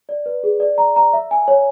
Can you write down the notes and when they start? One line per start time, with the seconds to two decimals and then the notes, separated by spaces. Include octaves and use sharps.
0.09 D5
0.26 B4
0.43 G#4
0.60 D5
0.78 A#5
0.96 A#5
1.13 E5
1.31 G#5
1.48 C#5